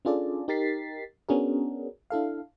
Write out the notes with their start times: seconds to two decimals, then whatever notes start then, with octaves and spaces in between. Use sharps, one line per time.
0.05 C#4 D4 F4 G#4 A4 D5
0.48 D#4 G4 A#4 A6 B6 C7
1.29 B3 C#4 D4 F#4 G#4 A#4
2.10 D4 E4 A4 F5